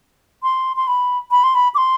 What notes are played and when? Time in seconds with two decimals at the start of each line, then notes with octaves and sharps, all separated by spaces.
0.43 C6
0.76 C6
0.87 B5
1.31 B5
1.44 C6
1.55 B5
1.75 D6
1.78 C6